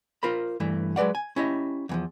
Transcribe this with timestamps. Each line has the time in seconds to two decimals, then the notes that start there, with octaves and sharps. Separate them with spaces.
0.23 F4 A#4 C5 B5
0.60 G2 E3 A3
0.96 F#3 G#3 B4 D5 F#5
1.15 G#5
1.36 C#4 E4 G4 D#5
1.89 E2 E3 F3